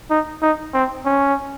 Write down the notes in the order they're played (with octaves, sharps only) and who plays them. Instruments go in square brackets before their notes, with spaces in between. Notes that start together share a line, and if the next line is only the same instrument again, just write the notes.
[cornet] D#4
D#4
C4
C#4